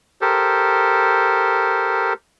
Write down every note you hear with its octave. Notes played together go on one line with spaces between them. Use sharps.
G4 A4 A#4 C5